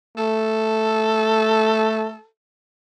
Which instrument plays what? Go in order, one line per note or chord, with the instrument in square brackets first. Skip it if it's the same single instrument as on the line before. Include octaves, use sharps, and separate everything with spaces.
[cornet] A3 [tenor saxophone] A4